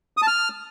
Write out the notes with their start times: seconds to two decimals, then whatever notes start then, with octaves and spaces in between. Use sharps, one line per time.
0.17 D#6
0.22 A5
0.27 F6